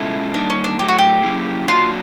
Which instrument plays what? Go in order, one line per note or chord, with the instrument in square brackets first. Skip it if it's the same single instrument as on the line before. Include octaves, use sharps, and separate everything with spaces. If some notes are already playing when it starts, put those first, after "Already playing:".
Already playing: [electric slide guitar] B2 G#3 C#4 F4 A4 [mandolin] E4
[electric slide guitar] G3 A#3 D#4 [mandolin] D4
[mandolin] C#4
D4
[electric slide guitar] A2 F#3 A3 [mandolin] G4
[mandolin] F#4
G4
[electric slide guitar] F#3 A#3 C#4 E4 G#4
[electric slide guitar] F#3 A#3 D4 F#4 [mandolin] F4